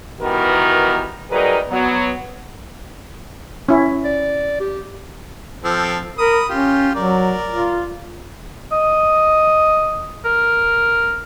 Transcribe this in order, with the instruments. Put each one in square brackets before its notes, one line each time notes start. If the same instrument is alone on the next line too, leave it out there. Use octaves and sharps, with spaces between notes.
[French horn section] D#3 E3 G3 B3 F#4 A#4
F#3 G3 D#4 G#4 A#4 B4
F#3 B3
[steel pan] C#4 E4
[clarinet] D5
G4
[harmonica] F3 C4 A4
[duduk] A#4 [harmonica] B5 D#6
[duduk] C#4 [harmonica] F4 G4
[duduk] F#3 [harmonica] A#4 D5
[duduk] F4
[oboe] D#5
A#4